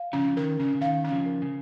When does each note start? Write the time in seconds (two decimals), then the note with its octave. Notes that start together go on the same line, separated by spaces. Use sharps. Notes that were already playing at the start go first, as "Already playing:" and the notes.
Already playing: F5
0.13 C#3 F3 C#4
0.37 D#3 A#4
0.59 C#3 C#4
0.75 C#3
0.81 D#3 F5
1.04 C#4
1.11 C#3 F3
1.26 A#4
1.42 C#3